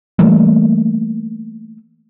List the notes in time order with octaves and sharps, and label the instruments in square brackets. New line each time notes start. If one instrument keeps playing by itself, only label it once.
[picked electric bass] E3 G3 A3 A#3